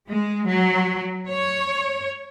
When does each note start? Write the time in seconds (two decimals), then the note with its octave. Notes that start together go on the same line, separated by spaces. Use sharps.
0.11 G#3
0.49 F#3
1.29 C#5